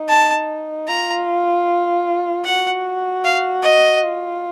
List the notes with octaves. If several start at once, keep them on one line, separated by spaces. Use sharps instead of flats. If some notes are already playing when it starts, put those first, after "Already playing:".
Already playing: D#4
A5
F4 A#5
F#4 F#5
F5
D#5
F4